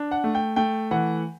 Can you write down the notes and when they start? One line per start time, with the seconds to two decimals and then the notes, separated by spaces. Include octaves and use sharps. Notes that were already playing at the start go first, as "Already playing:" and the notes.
Already playing: D4
0.11 F#5
0.24 A3
0.35 G5
0.56 A3 G5
0.91 E3 F#5